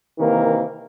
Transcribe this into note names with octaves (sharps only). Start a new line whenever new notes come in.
C3 D#3 E3 A#3